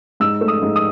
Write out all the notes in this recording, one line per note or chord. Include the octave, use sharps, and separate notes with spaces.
G#2 E6
A3
D#6
G#2
D#6